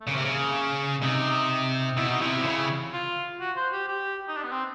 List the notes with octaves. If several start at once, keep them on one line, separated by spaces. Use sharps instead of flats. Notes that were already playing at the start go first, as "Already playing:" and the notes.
A3
C#3 A#3
C3
C#3
C3 D#4
B2 E4
D#4
C3 E4
D3
C#3
F4
F#4
C5
G4
G4
D#4
D4
B3
C4